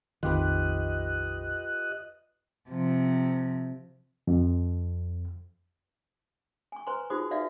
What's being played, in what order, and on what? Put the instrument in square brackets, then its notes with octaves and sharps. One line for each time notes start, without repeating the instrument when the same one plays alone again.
[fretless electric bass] A#1 F2 D#3 [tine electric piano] F4 G4 B4 [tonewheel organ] D#5 F#6
[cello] C3 F3
[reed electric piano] F2
[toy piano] G#5 C#6
B4 C5 G#5 A#5 C6 C#6
D#4 F4 F#4 G#4 C5 D#6
D#4 F#4 B4 D5 E5 F5